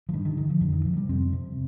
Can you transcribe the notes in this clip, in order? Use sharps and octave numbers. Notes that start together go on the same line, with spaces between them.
F3
G2 D#3
D#3
D3 D#3
F3
F2 D3
D#3
C3 F3
G3
F2 C4
C3